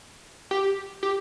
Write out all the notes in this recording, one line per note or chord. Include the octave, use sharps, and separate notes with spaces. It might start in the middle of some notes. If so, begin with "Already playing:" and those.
G4
G4